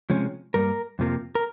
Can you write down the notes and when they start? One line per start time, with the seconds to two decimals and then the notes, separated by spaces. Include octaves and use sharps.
0.10 C3 F3 G#3 C#4
0.54 G2 G3 A#3 A#4
0.99 F2 C3 F3 A#3
1.35 A#4